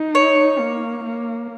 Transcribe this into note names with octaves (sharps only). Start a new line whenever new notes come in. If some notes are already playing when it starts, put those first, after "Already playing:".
Already playing: D#4
C#5
A#3
A#3